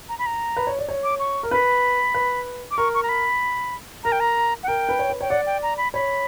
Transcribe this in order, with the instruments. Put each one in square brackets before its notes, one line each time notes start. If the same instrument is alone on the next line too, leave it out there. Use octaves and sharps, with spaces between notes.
[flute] A#5
B5
A#5
[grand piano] B4
C#5
D5
C#5
[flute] D6
C#6
[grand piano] A#4
[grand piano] B4 [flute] B5
[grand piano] B4
[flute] D6
[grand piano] A#4 [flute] C#6
[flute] C#6
A#5
B5
[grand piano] A#4 [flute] A#5
[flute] G5
A#5
F#5
[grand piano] A#4 [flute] G5
[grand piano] B4
C#5
B4
[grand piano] C#5 [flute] G5
[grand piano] D5 [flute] F#5
[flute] G5
A#5
B5
[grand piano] C#5 [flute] B5